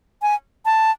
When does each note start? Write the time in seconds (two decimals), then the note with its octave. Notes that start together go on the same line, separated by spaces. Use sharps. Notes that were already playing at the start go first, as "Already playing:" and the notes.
0.22 G#5
0.65 A5